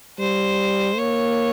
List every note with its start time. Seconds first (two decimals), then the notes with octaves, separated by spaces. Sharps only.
0.19 G3 C5
0.97 A#3 C#5